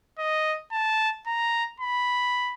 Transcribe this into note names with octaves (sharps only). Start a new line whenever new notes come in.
D#5
A5
A#5
B5